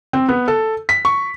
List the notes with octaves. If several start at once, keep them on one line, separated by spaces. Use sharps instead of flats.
C4
B3
A4
B6
C#6